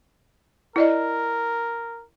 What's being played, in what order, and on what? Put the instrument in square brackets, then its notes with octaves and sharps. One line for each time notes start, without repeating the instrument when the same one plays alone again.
[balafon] E4 D5 D#5 [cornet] A#4